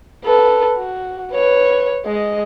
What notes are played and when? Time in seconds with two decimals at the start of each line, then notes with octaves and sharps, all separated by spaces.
0.24 A4 B4
0.77 F#4
1.32 B4 C#5
2.05 G#3 D#5